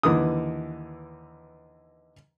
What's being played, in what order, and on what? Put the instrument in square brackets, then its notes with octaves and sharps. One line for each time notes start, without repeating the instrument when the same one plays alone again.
[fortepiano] D#2 D3 E3 B4 D#6